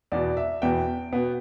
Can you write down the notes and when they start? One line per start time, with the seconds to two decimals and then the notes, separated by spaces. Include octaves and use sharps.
0.12 E2 B2 B3 D5
0.37 E5
0.62 E2 B2 B3 G5
1.13 B2 B3